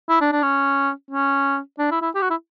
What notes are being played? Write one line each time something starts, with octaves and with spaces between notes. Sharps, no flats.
E4
D4
D4
C#4
C#4
D4
E4
E4
G4
F#4
E4